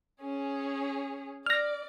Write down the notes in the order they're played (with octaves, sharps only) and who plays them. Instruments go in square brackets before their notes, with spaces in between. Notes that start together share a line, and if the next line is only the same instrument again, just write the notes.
[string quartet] C#4 G#4
[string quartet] D5 [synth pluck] F6 A#6